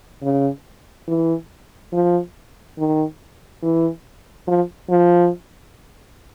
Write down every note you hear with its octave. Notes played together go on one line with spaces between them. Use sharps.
C#3
E3
F3
D#3
E3
F3
F3